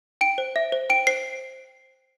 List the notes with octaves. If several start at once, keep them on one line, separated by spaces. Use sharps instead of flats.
G5 D7
C5
E5
C5
G5 D7
C5 C7